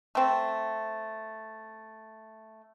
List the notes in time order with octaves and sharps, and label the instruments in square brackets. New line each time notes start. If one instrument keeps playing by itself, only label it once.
[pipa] A3 C4